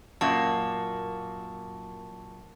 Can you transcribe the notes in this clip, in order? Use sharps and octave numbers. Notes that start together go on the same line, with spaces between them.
F#2 A#2 A#3 A5 C#6